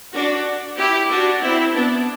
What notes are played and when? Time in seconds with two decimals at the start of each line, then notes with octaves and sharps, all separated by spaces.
0.14 D4 F#4
0.78 E4 G4
1.11 D4 F#4
1.43 C4 E4
1.75 B3 D4